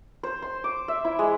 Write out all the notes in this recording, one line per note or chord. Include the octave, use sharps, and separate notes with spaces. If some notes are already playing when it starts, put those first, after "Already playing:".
C5
C6
D6
E5
E4
G#3